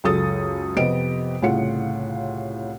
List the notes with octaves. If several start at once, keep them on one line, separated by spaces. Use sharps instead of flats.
C#2 F#2 A4 D#6 A6
F2 C3 B3 G4 D#5 D7
C2 A2 C#3 F4 F#5 C#7